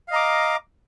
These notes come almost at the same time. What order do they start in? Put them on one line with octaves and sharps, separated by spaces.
F5 D#5 A#5 D6